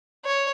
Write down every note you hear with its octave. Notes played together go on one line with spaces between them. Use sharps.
C#5